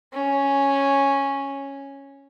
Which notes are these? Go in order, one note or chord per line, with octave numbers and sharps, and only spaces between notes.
C#4